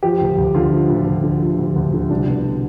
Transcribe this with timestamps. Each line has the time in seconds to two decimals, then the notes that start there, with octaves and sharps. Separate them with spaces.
0.03 F3 G4
0.21 D2
0.38 D2
0.54 D3 F4
0.72 F3
0.89 D2
1.07 D2
1.24 D3
1.41 F3
1.59 D2
1.76 D2
1.94 D3
2.10 C2 D4
2.28 B2